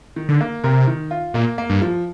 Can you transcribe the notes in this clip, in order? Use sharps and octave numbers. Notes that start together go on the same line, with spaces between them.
D#3
D3
A#3
C3 A#4
D#3
F4
A#2 A#3
A#3
G2
F3